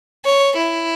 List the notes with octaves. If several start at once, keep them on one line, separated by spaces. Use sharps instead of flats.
C#5
E4